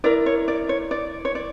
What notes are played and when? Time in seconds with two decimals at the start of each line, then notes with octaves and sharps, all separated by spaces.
0.04 E4 A#4 D5
0.26 C#5
0.48 D5
0.69 C#5
0.91 D5
1.25 C#5
1.35 D5